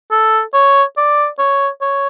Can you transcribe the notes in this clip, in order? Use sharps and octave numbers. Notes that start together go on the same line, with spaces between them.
A4
C#5
D5
C#5
C#5